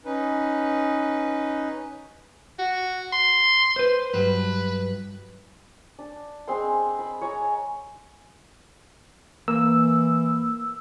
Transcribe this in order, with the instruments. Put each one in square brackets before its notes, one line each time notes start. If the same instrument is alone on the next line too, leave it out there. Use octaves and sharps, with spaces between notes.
[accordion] C#4 D#4 B4
[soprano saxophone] F#4
C6
[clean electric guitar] B4 C5
[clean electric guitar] G2 F#3 [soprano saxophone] B4
[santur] D4
G#3 C4 B5 C6
B5
C#5 G#5 A#5
[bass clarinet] E3 [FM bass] A#3 [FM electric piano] E6